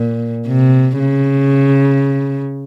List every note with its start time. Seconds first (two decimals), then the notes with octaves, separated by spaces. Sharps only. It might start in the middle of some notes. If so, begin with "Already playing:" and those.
Already playing: A#2
0.47 C3
1.00 C#3